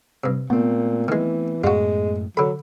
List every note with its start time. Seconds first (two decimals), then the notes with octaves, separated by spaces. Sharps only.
0.24 G2 C3
0.50 A#2 A3 B3 C4
1.08 D#3 E3 G#3
1.64 F#2 A2 G#3 F4 F#4
2.37 D3 F#3 A4 B5